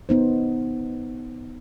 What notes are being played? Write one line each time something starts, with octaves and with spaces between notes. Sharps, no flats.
B3 D#4 C5